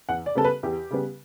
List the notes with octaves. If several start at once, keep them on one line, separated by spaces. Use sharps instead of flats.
E2 F#5
D5
C#3 G3 B3 A4
B4
E2 G4
C#3 G3 B3